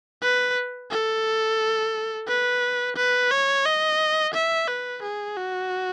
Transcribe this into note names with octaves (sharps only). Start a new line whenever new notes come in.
B4
A4
B4
B4
C#5
D#5
E5
B4
G#4
F#4